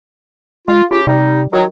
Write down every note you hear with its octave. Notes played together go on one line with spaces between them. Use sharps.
G#3 F4
C#3 F4 G4
C3 G3 D#4
D#3 F#3 F#4